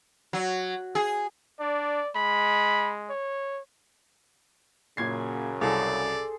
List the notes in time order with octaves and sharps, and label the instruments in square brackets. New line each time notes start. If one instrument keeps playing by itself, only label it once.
[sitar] F#3
G#4
[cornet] D4 [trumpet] D5
[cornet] G#3 [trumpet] B5
[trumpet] C#5
[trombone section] F#2 C#3 [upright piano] A#2 G#6 C7
[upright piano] C2 [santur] G#4 A4 C5 [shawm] D5